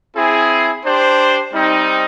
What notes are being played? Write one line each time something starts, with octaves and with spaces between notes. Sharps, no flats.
C4 E4 G#4
D4 G4 C5
G3 C4 D#4